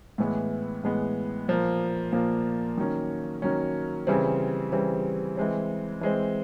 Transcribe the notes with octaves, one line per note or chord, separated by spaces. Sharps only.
A2 E3 G#3 B3
A2 E3 G#3 B3
A#2 F3 A#3
A#2 F3 A#3
D#3 F#3 A#3 C#4
D#3 F#3 A#3 C#4
C#3 E3 G3 C4
C#3 E3 G3 C4
E3 G#3 C4
E3 G#3 C4